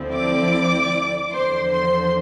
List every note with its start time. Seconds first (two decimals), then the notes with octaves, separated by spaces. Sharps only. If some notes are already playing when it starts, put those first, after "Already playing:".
Already playing: D2 D3 F3 C4 E4
0.12 D5 D6
1.32 E2 D3 F3 C5 C6
1.72 C5 C6